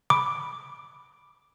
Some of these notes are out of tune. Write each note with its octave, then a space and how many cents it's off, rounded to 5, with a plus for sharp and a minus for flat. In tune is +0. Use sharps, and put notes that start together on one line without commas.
B5 +0 D6 +5